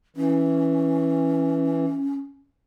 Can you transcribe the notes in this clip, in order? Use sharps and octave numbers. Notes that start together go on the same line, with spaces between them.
E3 C#4